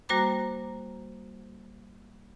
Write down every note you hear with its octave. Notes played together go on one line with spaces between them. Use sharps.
G3 A#3 F#4 C5 A#5 D6